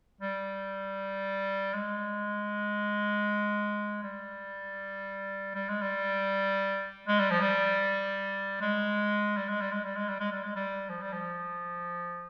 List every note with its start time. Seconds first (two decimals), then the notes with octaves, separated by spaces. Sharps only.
0.21 G3
1.74 G#3
4.03 G3
5.55 G3
5.69 G#3
5.82 G3
7.08 G#3
7.19 G3
7.31 F3
7.41 G3
8.61 G#3
9.37 G3
9.48 G#3
9.61 G3
9.72 G#3
9.84 G3
9.96 G#3
10.09 G3
10.20 G#3
10.32 G3
10.44 G#3
10.56 G3
10.89 F3
11.01 G3
11.13 F3